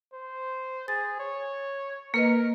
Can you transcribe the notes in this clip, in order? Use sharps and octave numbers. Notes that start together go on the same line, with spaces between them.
C5
G#4 A6
C#5
A#3 A#4 B4 D#5